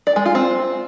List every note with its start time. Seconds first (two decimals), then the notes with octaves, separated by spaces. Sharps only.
0.07 D5
0.16 G#3
0.25 F4
0.35 C4